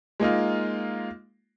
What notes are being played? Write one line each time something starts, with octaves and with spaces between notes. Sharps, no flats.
G#3 A#3 D#4 F4